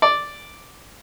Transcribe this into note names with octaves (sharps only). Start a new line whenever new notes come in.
D5